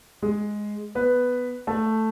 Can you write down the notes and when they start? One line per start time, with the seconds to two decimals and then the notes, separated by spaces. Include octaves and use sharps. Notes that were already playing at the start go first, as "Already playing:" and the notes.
0.22 G#3 G#4
0.95 B3 B4
1.67 A3 A4